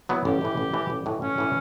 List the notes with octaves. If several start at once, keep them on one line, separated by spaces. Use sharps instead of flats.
F#3 B3 E4
A1 G4
A2 E3
A1
A2 E3
A1
A2 E3
A1 C#4
A2 E3